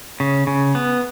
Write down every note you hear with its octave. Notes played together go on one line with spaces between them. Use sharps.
C#3
C#3
B3